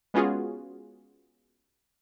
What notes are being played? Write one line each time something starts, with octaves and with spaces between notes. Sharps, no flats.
G#3 B3 C#4 F4 F#4 G#4